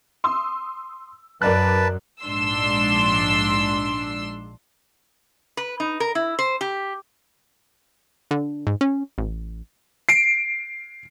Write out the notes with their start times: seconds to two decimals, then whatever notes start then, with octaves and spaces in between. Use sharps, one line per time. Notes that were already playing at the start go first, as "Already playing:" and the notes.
0.24 C6 D#6 E6
1.42 F#2 A#4 B4 D5 A5 F#6
2.22 A#1 G#2 D4 C6 E6
5.57 B4
5.80 D#4
6.00 A#4
6.15 E4
6.39 C5
6.61 G4
8.31 D3
8.67 G#2
8.81 C#4
9.18 A1
10.09 C7 D7